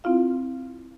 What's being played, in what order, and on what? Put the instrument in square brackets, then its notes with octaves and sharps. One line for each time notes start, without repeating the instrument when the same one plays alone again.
[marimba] C4 E4 F4 F5